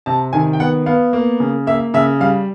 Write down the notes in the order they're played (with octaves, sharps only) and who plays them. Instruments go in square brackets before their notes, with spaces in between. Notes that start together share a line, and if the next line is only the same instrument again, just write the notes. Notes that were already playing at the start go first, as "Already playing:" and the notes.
[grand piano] C3 A5
D#3 G#5
G5
B3 F#5
B3 F5
A#3
C#3
A#3 E5
C#3 E5
G3 F5